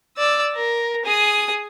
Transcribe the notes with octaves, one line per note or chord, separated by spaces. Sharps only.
D5 E6
A#4
G#4 D#6